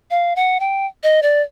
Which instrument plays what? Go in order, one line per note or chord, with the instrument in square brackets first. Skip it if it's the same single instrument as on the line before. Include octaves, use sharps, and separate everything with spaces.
[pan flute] F5
F#5
G5
D#5
D5